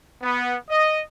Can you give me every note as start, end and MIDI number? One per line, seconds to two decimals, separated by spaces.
0.21 0.54 59
0.70 1.00 75